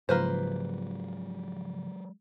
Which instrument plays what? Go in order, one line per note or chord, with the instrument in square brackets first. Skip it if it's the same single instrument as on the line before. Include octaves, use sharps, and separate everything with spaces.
[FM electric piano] G#2 C#3 F3 [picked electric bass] F#3 G#3 [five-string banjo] A#3 B4 C5